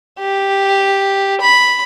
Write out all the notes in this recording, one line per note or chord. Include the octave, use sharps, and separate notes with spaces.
G4
B5